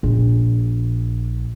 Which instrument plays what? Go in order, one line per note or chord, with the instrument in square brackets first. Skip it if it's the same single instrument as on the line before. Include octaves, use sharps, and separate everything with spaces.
[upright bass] A#1